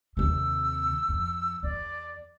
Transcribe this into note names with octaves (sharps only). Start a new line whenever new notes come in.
D#2 C3 E6
F2
E2 D5